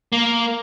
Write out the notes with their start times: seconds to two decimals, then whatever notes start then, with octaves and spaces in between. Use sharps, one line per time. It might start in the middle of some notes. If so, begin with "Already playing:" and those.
0.12 A#3